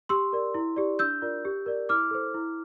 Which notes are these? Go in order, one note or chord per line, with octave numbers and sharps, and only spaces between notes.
G4 C6 E6
A#4 D5
E4
G4 D5
D4 E6 G6
F4 A#4 D5
G4
A#4 D5
E4 D6 F6
A4 C5
E4